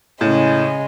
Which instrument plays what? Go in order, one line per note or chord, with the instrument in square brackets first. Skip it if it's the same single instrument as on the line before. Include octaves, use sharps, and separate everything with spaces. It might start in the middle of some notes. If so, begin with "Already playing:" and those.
[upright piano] A2 [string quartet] C#3 G#3 C#4